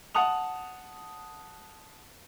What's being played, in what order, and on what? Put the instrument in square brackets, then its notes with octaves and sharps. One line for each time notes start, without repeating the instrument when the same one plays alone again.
[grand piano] F#5 A5 D#6 F7